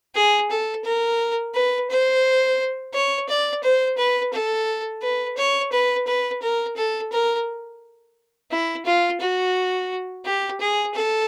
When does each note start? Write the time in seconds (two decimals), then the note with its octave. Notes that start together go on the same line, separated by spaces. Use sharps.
0.15 G#4
0.50 A4
0.84 A#4
1.54 B4
1.90 C5
2.94 C#5
3.29 D5
3.64 C5
3.98 B4
4.33 A4
5.02 B4
5.37 C#5
5.72 B4
6.07 B4
6.42 A#4
6.76 A4
7.12 A#4
8.51 E4
8.86 F4
9.21 F#4
10.25 G4
10.61 G#4
10.95 A4